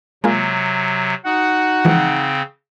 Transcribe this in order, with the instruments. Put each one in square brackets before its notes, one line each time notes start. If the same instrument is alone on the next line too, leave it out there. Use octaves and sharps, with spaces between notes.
[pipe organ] C3 F#3 [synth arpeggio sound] G#3 A#3 F4
[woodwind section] D#4 F#5 [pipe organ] F#4
[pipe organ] C#3 C4 [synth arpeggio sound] E3 F3 G#3